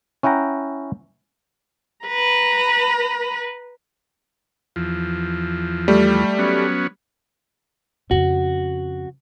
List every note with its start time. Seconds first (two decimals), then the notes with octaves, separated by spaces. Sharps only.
0.23 C#4 E4 F#5 G5 A#5
2.06 B4 A#5
4.76 E2 F3
5.88 G3 A3
6.39 F#3 B3 C#4
8.11 F2 C#3 F#4